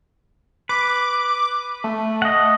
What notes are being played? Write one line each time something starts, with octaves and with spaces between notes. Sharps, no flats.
B4 D6
A3
D#5 F#5